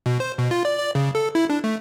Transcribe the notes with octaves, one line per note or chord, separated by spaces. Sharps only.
B2
C5
B2
F4
D5
D5
C#3
A4
E4
D4
A3